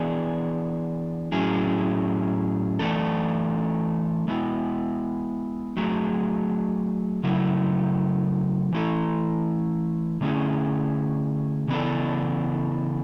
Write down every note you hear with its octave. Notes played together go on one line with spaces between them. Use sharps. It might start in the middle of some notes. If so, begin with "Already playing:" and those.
Already playing: E3 B3 D4 G#4
A2 F#3 C#4 E4 G#4
E3 A3 D4 A4
G#3 B3 E4
F#3 A3 D4 G#4
C#3 F#3 A3 E4
E3 A3 E4 A4
D3 A3 C#4 E4 G#4
C#3 E3 B3 D4 A4